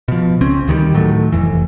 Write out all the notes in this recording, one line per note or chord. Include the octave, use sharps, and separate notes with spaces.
B2 F3
C#2 C4 C#4
D2 D#3 E3 G3
A2 D#3 F#3 A3
F1 F2 E3